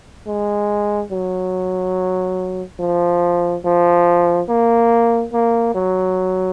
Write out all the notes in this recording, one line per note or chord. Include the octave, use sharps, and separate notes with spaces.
G#3
F#3
F3
F3
A#3
A#3
F#3